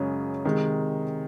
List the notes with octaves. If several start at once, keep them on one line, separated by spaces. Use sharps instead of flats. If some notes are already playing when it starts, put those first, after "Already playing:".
Already playing: F#2 C#3 G#3 C#4
C3 D#3 G#3